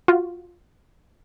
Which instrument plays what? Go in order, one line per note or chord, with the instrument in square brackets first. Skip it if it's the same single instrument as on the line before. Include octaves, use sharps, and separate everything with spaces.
[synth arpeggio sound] F4 F#4